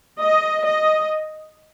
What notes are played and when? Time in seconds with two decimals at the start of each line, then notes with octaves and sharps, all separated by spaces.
0.20 D#5
0.65 D#5